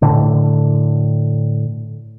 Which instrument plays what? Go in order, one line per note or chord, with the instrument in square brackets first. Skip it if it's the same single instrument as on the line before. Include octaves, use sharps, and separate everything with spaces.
[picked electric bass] A2 D3